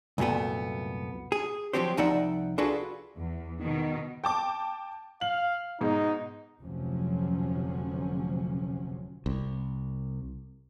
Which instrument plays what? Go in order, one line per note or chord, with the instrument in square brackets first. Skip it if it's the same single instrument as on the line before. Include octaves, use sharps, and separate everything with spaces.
[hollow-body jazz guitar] C2 F#2 A#2 A3 B3
G#4
F3 F#3 C4 G4 C5
C2 F3 D#4 D5 E5 F#5
D4 F4 F#4 G#4 A4 B4
[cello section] E2
B2 D#3
[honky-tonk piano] G5 A5 D6
[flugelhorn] F5 [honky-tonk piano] F#7
[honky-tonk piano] G#2 B2 G#3 [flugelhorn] D#4
[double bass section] F1 D2 C3 F3 F#3 C#4
[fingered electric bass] C2